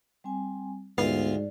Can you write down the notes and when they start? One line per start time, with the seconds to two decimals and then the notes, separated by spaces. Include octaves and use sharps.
0.24 G3 C4 G#5
0.98 D2 G#2 B3 F4 D5 F5